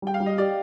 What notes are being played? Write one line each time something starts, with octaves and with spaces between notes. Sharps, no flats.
G3 G5
F5
G3
D#5
G4 D5